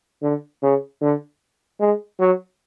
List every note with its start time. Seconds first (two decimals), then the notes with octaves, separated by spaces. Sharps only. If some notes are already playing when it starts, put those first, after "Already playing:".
0.22 D3
0.63 C#3
1.02 D3
1.80 G#3
2.19 F#3